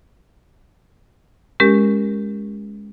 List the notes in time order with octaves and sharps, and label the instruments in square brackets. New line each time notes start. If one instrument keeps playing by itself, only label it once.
[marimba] G#3 C#4 G4 A#4